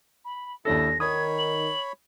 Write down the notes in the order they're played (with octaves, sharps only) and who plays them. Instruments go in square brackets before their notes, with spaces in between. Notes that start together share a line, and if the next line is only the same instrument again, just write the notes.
[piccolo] B5
[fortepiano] D#2 D4 A4 [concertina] E4 [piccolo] A#6
[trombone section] D#3 [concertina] C#5 B5 [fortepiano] D#6 [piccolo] G#6
[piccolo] F#7